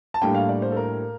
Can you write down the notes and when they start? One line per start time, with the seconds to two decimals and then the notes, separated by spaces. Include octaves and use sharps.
0.14 A5
0.21 A2 G3 A#3 D4 G5
0.35 F5
0.49 D5
0.62 C5
0.72 A4
0.77 A#4